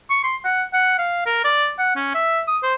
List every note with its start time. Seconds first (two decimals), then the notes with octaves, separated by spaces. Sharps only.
0.10 C#6
0.24 C6
0.45 F#5
0.73 F#5
0.98 F5
1.26 A#4
1.44 D5
1.78 F#5
1.96 C#4
2.14 E5
2.48 D#6
2.63 C5